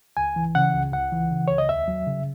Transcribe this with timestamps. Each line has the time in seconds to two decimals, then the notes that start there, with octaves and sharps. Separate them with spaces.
0.17 C#2 G#5
0.36 E3
0.55 C#3 F#5
0.74 C#2
0.93 C#2 F#5
1.12 E3
1.31 C#3
1.48 C#2 C#5
1.58 D#5
1.69 D#2 E5
1.88 F#3
2.07 C#3